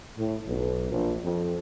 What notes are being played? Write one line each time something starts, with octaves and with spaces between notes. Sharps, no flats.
A2
B1
A#1
F2